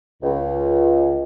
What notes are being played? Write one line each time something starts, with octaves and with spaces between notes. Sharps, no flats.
C#2